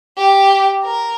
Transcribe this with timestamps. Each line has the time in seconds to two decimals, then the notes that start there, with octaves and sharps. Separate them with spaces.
0.18 G4
0.84 A#4